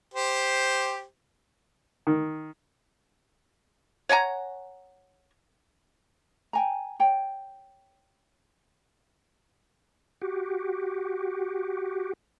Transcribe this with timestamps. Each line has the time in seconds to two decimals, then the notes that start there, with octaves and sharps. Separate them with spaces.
0.14 G4 C5
2.07 D#3
4.09 C#5 F#5 G#5 A#5
6.53 G5 G#5 A#5
7.00 C#5 G5
10.22 F#4 G4